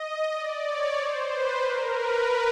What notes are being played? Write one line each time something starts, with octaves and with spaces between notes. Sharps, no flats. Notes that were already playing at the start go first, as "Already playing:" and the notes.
Already playing: D#5
D5
C#5
C5
B4
A#4
B4